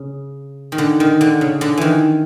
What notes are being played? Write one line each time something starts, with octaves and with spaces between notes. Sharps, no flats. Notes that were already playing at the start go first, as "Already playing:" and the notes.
Already playing: C#3
D#3
D3
D#3
D3
C#3
D3
D#3 E3